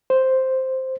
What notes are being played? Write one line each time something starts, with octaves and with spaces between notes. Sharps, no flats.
C5